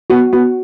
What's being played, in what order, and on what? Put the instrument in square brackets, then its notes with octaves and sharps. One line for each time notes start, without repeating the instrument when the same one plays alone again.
[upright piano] B3 [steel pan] F#4
[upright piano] B3 [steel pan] F#4